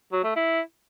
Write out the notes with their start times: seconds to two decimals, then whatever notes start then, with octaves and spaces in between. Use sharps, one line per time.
0.12 F#3
0.24 A3
0.36 E4